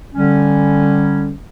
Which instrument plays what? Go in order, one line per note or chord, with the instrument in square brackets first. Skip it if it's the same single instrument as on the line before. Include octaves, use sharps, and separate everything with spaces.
[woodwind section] D3 G3 C#4